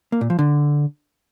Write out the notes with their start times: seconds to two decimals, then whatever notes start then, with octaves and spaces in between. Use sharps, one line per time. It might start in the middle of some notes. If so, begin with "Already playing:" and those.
0.12 A#3
0.21 A#2
0.30 F3
0.39 D3